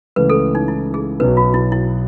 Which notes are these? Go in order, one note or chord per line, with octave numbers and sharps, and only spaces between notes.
C#2 C#3 E3 A3 B4
A4
D#4
E4
G#4
B1 B2 F#3 B3 B4
F#4
E4
E4